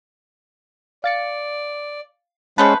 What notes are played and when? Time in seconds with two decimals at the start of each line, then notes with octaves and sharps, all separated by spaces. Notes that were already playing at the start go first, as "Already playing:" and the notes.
1.04 D5 F5 A6 C#7
2.58 G#3 A3 B3 C#4 B4 C5 A5 G6